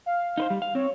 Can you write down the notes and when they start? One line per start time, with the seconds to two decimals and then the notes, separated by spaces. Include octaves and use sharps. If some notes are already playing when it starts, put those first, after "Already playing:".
0.06 F5
0.38 D#4 B4 C5
0.50 G3
0.62 F5
0.75 C4 C#5